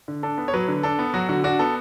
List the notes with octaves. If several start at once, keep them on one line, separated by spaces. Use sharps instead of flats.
D3
D4 A4
B3
C#5
F#3 B4
D3
D4 A4
B3
F#3 F#4
D3 F#4
D4 F#4
B3 A4